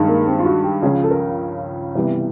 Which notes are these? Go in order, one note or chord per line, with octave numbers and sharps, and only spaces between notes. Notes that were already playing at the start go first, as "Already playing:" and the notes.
Already playing: G2 D#3 G#3
A#3
C4
F4
F#4
G4
C#2 C#3 F3 G#4
A4
A#4
C3 E3 G3 B3